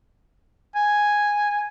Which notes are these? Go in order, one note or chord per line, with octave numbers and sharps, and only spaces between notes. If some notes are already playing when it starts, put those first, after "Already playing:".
G#5